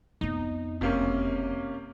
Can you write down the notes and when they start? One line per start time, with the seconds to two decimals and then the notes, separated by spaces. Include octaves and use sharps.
0.21 F2 B3 D#4
0.81 F#1 C3 A#3 C#4